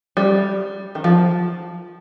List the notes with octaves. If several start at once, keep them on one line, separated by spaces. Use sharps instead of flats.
G3
D#3
F3